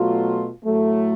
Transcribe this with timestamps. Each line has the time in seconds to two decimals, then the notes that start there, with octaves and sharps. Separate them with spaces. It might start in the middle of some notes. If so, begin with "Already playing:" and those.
Already playing: B2 F#3 A3 F4
0.64 A2 F#3 A3